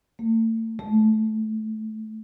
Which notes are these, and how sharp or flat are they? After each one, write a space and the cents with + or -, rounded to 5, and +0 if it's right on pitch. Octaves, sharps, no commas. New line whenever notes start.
A3 +35
A3 -15